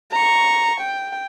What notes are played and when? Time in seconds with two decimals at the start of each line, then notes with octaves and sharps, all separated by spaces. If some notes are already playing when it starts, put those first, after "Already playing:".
0.12 A#5 C#6
0.80 G5